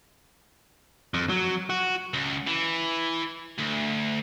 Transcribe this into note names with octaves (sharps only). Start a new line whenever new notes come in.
F2
F#3
F#4
C#2
E3
D2